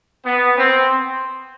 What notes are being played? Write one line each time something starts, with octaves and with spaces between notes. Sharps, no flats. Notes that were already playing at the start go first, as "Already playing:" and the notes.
B3
C4